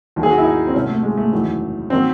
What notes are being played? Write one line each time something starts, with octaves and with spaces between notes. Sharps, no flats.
D#2 D#3 F#3
G#4
F#4
E4
D#4
C4
C2 C3 F#3 C#4
A3
G#3
A3
F#1 E2 D#3 F#3
D#3 F#3 C4